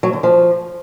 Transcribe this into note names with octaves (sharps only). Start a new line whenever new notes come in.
F#3
D3
F3